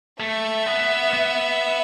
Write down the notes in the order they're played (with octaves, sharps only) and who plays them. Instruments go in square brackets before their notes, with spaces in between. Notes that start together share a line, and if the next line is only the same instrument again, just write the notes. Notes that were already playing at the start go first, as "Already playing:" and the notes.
[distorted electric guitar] A3 [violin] E5
[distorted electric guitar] B3
B3